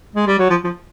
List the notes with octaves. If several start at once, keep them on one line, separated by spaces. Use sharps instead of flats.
G#3
G3
F#3
F3
F3